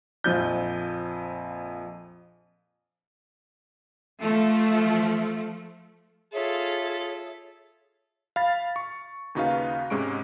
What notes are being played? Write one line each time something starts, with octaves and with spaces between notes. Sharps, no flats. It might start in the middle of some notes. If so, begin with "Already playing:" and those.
A#1 F2 G6
F3 A3
F4 G#4 A4 C#5 E5
F5 B5 A6
C#6
D#2 C#3 D#4 F#4 B4 F5
G#2 C3 G#3 C#4 C#6 D7